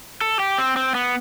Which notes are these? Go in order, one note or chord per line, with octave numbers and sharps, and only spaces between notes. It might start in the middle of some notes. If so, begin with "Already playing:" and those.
A4
G4
C4
C4
B3